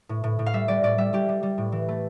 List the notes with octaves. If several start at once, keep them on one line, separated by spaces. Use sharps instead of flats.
A2
A2
A2
F5
G3 E5
G3 D5
A2 D5
G3 E5
G3 G4
G3
G3
A2
E3
A3